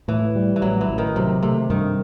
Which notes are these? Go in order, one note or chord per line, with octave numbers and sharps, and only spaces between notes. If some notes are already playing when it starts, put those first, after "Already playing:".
A2 E3
G3
E3
A1 F#3
E3
A1
D#3
C3 F#3
C3 A3
G2 D#3